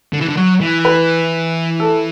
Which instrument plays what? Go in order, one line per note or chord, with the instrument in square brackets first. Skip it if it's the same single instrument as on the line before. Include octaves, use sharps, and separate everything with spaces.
[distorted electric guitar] D3
E3
D3
F#3
E3
[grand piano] B4
A4